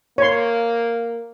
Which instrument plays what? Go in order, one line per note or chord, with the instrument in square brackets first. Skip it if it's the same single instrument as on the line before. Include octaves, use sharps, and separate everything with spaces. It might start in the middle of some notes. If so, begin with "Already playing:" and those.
[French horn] A#3 [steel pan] C#5 C6